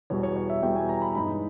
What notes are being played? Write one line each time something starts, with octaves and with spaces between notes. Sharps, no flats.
E2 B2 G3 C#5
C#5
C#5
E5
E2 B2 G3 G5
G#5
A#5
B5
G2 E3 G#3 D#4 B5